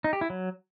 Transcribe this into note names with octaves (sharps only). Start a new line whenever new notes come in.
D#4
G4
E4
F#3